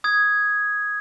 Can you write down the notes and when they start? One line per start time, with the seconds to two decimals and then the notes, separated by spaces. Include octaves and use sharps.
0.04 D#6 G#6